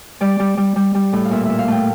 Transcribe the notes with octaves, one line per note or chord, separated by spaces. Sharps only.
G3 D5
G3
G3
G3
G3
A2
F5
A#2 E5
E5
A#2
F5
A3 G5